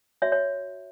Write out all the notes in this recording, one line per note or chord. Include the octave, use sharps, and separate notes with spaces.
F#4 C#5 E5
C#5